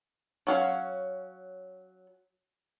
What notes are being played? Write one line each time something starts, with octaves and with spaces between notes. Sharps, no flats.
F#3 C#4 F5